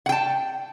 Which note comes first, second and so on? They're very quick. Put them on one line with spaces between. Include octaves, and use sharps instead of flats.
F#5 G5 A5